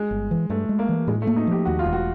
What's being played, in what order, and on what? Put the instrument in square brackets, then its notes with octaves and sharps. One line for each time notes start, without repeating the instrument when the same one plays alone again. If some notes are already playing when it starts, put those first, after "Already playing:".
Already playing: [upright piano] G#3
[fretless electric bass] G1
E3
[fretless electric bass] G2 [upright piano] A3
[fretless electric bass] G#3
[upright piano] A#3
[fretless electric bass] E3
[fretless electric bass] A2 [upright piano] G#3
[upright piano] A3
[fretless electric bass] A#3
[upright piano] D#4
[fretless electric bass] F3 [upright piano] G4
[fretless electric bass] D#2 [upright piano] F#4
[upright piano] F4
[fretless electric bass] E1
[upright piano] F#4